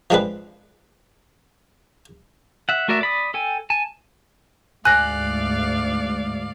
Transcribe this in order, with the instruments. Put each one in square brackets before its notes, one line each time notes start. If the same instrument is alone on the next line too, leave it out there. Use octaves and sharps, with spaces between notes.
[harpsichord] F3 G#3 C4 D4 B4
[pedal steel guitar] E5 F#5
A3 F#4 A#4 D5 E5
D5 B5 D#6
A4 G5 G#5
G#5 A5
[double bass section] D2 G#2 [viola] D5 F5 [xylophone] G#5 A#6 [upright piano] F#6